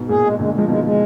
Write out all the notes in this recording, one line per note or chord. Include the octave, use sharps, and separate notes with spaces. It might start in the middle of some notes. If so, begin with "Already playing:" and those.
Already playing: G#2 B2
A#2 G#4
G#3
A#2 D3 G#3
F3 G#3
B2 D#3 G#3
G#3